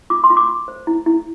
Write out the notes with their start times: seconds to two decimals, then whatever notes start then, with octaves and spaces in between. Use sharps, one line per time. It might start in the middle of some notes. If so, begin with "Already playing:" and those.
0.10 F4 D6
0.24 C6
0.30 F4
0.37 D6
0.48 F4
0.68 C5
0.87 E4
1.06 E4